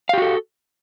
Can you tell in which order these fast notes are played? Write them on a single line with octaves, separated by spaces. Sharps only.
F5 G4 F#4 A4